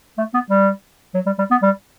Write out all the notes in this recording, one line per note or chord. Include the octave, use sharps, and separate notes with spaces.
A3
B3
G3
F#3
G3
G3
B3
G3